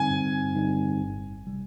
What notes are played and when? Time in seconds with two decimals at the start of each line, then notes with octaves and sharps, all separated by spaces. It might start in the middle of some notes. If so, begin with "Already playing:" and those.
Already playing: G2 D3 G3 C4 D#4 G#5
0.11 G2
0.55 D3 G3 C4 D#4
1.01 G1
1.46 C3 G3